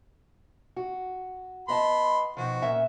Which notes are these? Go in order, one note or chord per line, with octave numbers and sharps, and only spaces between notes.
F#4
B3 D#5 A5 B5 C6
B2 D#3 F3 F#4
A#2 C#4 E5